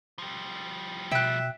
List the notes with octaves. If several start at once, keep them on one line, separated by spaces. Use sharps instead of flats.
F3 G3
B2 E5 G5 F#6